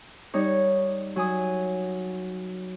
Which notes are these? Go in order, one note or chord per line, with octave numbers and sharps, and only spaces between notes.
G3 D#4 C#5
F#3 G#5 D#6